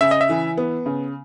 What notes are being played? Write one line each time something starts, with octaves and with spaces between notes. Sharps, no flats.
C#3 E5
D#5
E5
E3
B3
C#3